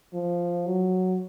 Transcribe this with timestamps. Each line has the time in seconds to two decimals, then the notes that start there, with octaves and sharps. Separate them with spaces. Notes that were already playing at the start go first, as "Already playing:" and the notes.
0.14 F3
0.67 F#3